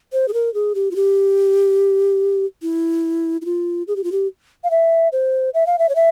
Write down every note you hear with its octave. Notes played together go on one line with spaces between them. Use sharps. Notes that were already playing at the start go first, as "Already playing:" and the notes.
C5
G#4
A#4
G#4
G4
F4
G4
E4
E4
F4
G#4
G4
F4
G4
F5
E5
C5
E5
F5
E5
C#5
E5